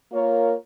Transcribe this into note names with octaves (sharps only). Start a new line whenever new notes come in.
A#3 F4 A#4 C#5